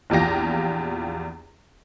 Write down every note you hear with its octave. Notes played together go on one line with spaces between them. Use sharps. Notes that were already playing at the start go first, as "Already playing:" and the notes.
A#1 E2 F4 G4 A#6